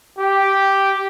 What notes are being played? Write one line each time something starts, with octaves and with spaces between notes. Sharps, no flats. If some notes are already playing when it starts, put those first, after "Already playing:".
G4